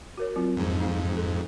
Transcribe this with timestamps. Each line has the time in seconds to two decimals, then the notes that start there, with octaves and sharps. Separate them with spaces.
0.18 F#4 A#4 C#5
0.36 F#3 C4 F4
0.56 F2 G#2
0.80 D#4 F5
1.17 A4